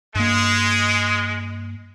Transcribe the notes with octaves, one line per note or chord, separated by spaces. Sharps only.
G2 G#3 A#3